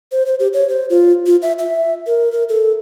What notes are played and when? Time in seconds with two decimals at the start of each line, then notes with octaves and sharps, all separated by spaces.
0.12 C5
0.26 C5
0.40 G4
0.53 C#5
0.69 C5
0.90 F4
1.26 F4
1.42 E5
1.59 E5
2.07 A#4
2.32 A#4
2.49 A4